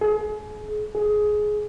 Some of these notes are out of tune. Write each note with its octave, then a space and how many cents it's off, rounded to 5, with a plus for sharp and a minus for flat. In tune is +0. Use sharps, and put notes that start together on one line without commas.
G#4 +35
G#4 +15